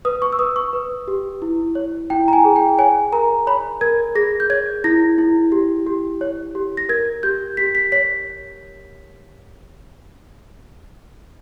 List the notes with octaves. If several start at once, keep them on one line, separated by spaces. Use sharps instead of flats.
B4 D#6
C#6
E6
B4 D#6
C#6
B4
G4
E4
C#5
E4 G5
A#5
G#5
G#4
G5
C#5 G#5
A#4 A#5
C#5 B5
A#4 G#6
G#4 A#6
G6
C#5 G#6
E4 A#6
E4
G4
G4
C#5
G4
A#6
A#4 G#6
G4 G6
G4 B6
B6
C#5 B6